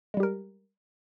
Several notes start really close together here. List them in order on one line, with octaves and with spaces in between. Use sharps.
G#3 G3 G4 A#4